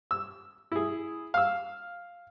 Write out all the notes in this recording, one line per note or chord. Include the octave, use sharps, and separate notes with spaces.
E6
E4 G#4
F5 E6